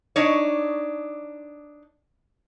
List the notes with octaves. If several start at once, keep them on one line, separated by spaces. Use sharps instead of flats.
D4 D#4 C#5